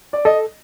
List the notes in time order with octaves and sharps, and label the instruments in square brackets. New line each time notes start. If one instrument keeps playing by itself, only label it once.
[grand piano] D5
[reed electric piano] A4 [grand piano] D#5